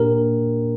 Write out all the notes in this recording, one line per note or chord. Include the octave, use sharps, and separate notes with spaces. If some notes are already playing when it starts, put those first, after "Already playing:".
Already playing: A#2 A#3 D4 G4 A#4